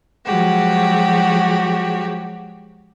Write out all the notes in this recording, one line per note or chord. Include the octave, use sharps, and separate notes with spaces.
F3 F#3 G#3 F#4 G4